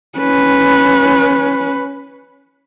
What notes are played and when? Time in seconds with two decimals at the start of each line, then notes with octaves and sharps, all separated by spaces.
0.19 C#4 B4